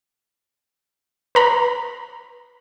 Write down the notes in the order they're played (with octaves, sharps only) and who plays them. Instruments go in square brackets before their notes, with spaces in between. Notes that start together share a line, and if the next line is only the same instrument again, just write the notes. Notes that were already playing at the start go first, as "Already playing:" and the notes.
[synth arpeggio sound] B4 A#5 B5